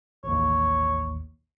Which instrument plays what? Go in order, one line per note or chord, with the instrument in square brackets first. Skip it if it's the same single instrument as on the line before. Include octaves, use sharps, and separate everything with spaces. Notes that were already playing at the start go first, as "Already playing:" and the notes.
[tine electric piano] A1 D#2 [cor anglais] C#5